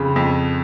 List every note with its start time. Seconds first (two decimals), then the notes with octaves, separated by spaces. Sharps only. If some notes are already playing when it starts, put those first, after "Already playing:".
Already playing: F2 C#3 B5
0.16 F2